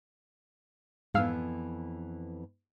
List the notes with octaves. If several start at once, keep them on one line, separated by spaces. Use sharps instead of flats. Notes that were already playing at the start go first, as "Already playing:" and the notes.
F2 G#2 E3 B3 F5 E6